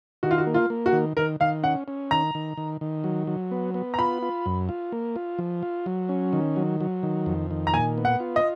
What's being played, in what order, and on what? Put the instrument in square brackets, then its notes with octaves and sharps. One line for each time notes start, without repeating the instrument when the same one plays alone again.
[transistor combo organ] D#3 [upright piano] F#4
[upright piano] F4
F#4
[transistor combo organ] A#3
[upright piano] F4
[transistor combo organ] A#3
[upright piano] F#4
[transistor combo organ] D#3
[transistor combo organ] D#3 [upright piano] A#4
[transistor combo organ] D#3 [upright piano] F5
[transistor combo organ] C#4 [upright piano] F#5
[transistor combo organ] C#4
[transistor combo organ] D#3 [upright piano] A#5
[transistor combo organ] D#3
D#3
D#3
F#3
F#3
B3
B3
[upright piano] A#5
[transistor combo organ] F4 [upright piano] B5
[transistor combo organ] F4
F#2
F4
A#3
F4
F3
F4
F#3
C#4
D#3
F#3
F#3
D#3
F2
D#3
[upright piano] A#5
[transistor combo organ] A#2 [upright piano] G#5
[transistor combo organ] B3
[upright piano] F#5
[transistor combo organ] F4
[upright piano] D#5